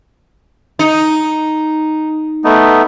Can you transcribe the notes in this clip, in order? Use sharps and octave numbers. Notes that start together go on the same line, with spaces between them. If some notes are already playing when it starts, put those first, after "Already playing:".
D#4
A3 B3 D#4